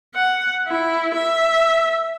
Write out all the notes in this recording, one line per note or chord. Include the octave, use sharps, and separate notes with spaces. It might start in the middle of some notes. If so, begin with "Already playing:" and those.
F#5
E4
E5